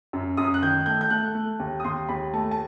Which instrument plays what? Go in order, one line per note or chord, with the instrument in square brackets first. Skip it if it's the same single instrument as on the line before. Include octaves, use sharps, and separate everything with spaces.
[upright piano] F#2
F#2 D#6
F#6
D#3 G6
A3 G6
G6
A3 F#6
A3
D#2
D#6
D#2 C6
D#2 B5
A3 A5
A5